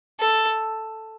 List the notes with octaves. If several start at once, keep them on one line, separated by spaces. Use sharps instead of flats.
A4